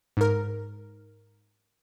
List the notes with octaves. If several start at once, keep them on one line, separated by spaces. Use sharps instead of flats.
G#2 A#4